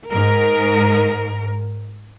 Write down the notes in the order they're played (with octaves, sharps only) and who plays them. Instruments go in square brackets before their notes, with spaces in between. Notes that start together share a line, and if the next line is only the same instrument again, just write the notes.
[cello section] G#2 A#4